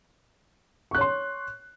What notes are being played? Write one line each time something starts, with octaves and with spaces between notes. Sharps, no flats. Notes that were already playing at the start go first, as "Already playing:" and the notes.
C#5 C6 C#6 F#6